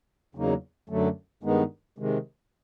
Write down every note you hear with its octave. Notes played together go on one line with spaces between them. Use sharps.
E2 C#3 F#3 A#3 D#4
F#2 D3 F#3 A3
G2 D#3 G#3 B3 D#4
C3 D#3 G#3